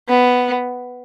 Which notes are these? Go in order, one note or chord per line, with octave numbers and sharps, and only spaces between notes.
B3